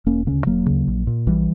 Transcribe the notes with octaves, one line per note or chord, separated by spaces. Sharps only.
E1 A#3 C#4
D2 C#3 A#3 C#4
E1 F#3 A#3
D2 C#3
A#1
A#2
A#1 E3 G3